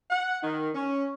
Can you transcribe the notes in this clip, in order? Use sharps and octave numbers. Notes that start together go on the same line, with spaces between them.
F#5
D#3
C#4